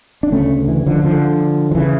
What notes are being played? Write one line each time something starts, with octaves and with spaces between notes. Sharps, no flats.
D4
D2 C#3 A3 C#4
E3
D3 F3
D3 F3
F3
C#3 E3